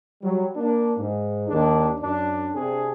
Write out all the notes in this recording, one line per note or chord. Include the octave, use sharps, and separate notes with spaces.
F#3 G3
A#3 D4
G#2
D#2 D#3 D4
F#2 D4
C3 C4 D4 G#4